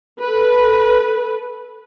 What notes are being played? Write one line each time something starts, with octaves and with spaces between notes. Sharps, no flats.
A4 B4